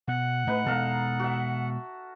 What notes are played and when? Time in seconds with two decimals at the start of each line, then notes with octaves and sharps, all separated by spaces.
0.08 B2 F#5
0.47 A2 A3 D#4 B4
0.66 B2 G#3 A4 F5 A#5
1.20 F#4 E5